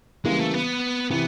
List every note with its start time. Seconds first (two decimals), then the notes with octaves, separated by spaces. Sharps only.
0.25 C#3 E3 G3 G#3 A#3
0.39 A3
0.53 B3
1.10 C3 E3 B3